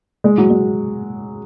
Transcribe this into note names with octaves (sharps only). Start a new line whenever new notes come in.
G#3
F#3
G#3